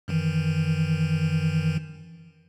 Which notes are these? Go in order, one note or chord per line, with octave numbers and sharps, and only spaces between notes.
F#2 D#3 E3